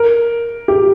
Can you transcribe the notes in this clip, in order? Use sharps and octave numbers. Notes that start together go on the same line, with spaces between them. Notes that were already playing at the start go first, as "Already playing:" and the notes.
Already playing: A#4
G4